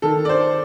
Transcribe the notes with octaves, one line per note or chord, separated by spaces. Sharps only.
D#3 A4
D5
C5